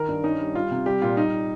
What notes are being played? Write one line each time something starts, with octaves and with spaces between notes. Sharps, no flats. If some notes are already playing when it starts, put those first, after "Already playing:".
Already playing: D#3 A#4
G2
C#4 D#4
G3
G3 F4
C3
G3 G4
A#2 F4
G3 D#4